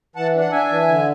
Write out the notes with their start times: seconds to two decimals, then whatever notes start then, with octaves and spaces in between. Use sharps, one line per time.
0.16 E3 F#5 A5
0.34 D4
0.39 F#5
0.52 D4 E5 G#5
0.69 E3
0.88 D3